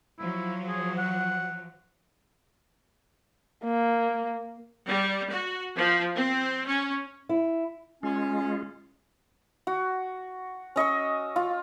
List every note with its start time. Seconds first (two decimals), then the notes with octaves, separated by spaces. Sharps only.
0.19 F3 F#3 E4
0.68 G#4
0.98 F#5
3.64 A#3
4.87 G3
5.30 F#4
5.77 F3
6.16 C4
6.67 C#4
7.29 E4
8.03 G#3 C#4 F4
9.67 F#4
10.76 C#4 D#5 C#6 E6
11.36 F4